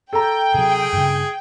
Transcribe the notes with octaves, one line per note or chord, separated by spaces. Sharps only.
A4 G5 A#5
C3 F#3 G#4
G2 C#3